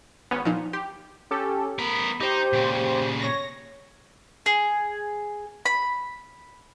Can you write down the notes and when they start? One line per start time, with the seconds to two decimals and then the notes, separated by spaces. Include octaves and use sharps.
0.31 G#1 B3 C#4
0.45 A#2 F3 D#4
0.73 G4 C6
1.31 C#4 G4 A4
1.79 B3 A#4 B5
2.20 D#4 G4 C5
2.53 A#2 C#3
3.22 C#5 A#6
4.46 G#4
5.65 B5